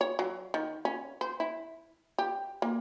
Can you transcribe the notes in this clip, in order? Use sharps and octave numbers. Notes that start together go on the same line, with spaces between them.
C#5
F#3
D#3
C#4
C5
E4
G4
A#3